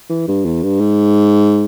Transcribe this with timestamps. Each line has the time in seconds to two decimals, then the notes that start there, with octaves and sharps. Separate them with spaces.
0.09 E3
0.28 G2
0.45 E2
0.63 G2
0.80 G#2